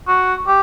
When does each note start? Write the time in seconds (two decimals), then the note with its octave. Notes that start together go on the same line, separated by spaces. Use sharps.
0.07 F#4
0.47 G4